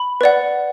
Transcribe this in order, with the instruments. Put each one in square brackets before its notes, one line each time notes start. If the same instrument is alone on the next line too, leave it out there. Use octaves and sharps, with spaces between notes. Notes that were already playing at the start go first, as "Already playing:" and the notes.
Already playing: [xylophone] B5
B4 D5 F#5